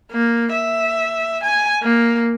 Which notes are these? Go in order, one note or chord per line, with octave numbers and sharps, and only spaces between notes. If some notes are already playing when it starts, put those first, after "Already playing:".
A#3
E5
G#5
A#3